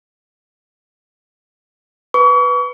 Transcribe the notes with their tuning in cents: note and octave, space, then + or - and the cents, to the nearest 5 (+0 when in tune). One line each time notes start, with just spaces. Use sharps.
B4 +0 C#6 +40